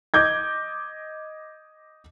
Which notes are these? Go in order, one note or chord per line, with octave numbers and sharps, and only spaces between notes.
D#5 D6 G6 G#6